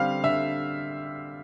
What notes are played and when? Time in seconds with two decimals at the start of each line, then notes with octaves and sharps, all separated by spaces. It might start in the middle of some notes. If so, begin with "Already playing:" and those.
Already playing: D3 G3 C4 F5
0.24 D3 E5